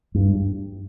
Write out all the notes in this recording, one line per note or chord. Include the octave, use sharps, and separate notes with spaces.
G2